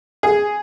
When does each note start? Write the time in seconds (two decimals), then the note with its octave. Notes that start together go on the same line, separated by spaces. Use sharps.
0.23 G#4